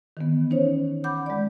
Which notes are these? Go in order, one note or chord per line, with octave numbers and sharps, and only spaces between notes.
D#3 E3 B3
C#4 D#4 C5 C#5
F#5 B5 D6 G6
G#3 D5